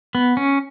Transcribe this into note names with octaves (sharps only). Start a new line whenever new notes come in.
B3
C#4